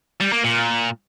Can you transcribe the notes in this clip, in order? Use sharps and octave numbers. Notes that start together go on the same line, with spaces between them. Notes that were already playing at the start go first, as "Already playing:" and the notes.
G3
A#3
A#2